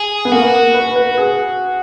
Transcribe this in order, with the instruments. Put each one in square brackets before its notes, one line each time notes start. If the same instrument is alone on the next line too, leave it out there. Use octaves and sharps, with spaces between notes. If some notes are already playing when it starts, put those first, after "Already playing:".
Already playing: [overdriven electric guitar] G#4
[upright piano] B3
[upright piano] A#3 [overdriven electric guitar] F#4
[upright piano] B4
B4
G#4